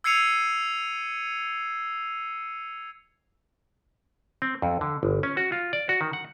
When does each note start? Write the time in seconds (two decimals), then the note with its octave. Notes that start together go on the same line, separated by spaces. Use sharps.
0.04 E6 G#6 C7 C#7 D#7 F7
4.42 C4
4.62 F2
4.81 D3
5.03 G1
5.23 C#4
5.37 F#4
5.52 F4
5.73 D5
5.89 F#4
6.01 D#3
6.13 F#5